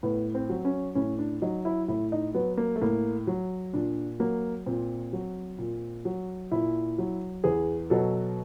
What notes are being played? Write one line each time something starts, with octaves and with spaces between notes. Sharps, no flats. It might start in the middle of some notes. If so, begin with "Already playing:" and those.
A2 B3
C4
F#3
C#4
A2 C#4
D4
F#3 D#4
E4
A2 E4
D#4
F#3 B3
A#3
A3
A2 A#3
F#3
A#2 D4
F#3 A#3
A#2 C4
F#3
A#2
F#3
A#2 E4
F#3
E2 G#4
B2 F#3 A4